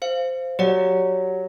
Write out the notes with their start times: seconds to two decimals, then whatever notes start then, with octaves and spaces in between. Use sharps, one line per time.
0.02 C5 F5
0.59 F#3 G4 D5 F#5